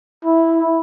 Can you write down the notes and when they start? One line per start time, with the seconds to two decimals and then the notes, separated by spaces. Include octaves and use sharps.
0.25 E4